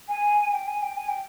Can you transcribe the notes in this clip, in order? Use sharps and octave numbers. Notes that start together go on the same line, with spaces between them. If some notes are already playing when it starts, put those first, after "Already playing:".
G#5
G5
G#5
G5
G#5
G5